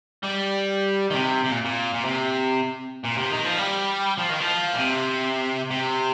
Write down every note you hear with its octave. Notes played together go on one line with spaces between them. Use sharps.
G3
D#3
C3
C3
A#2
A#2
A#2
C3
A#2
C3
D#3
F3
G3
F3
D#3
F3
A#2
C3
C3